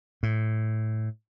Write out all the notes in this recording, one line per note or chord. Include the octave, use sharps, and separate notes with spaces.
A2